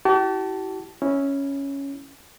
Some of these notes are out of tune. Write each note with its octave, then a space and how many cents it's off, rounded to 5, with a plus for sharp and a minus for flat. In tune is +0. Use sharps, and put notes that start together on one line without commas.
E4 +0 G4 -45 A5 +0
C#4 +0 E4 -20